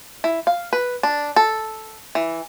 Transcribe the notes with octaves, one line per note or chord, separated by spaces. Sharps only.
E4
F5
B4
D4
A4
E3